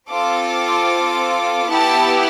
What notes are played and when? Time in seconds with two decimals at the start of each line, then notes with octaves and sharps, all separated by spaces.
0.10 C4 F4 A4 D6
1.67 B3 E4 G4 A5